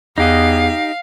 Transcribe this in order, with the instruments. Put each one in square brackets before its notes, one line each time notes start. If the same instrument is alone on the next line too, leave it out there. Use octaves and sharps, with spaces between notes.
[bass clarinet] E2 [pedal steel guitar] D#4 G4 D#5 [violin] F5